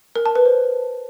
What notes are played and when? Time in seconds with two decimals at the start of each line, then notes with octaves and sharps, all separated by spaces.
0.16 A#4
0.26 A5
0.36 B4
0.46 C5